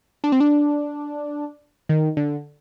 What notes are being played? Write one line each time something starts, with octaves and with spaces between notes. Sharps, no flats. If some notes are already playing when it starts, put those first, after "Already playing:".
D4
C4
D4
D#3
D3